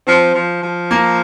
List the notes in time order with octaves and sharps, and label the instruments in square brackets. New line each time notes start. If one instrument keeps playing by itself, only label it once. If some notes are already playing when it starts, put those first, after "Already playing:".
[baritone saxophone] F3 [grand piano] C4
[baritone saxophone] F3
F3
[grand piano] A#3